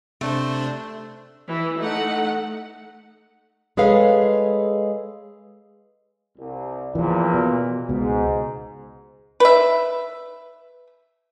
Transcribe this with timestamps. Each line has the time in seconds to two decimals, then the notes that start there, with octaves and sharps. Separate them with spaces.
0.21 C3 A3 D4 C5
1.48 E3 E4
1.80 A3 D#4 F#5
3.77 G#3 G#4 A4 B4 C#5 F5
6.38 C2
6.95 E2 A#2 E3 F3
7.34 B2
7.89 C#2 G#2 B2
9.40 B4 E5